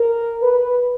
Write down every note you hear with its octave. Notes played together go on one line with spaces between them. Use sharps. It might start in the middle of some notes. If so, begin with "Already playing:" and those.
Already playing: A#4
B4